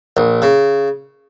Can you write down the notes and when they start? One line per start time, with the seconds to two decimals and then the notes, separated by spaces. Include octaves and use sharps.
0.17 A#1
0.42 C#3